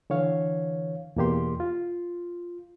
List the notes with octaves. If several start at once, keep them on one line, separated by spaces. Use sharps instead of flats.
D3 E3 C#5 F5
E2 B2 A#3 G4 C6
F4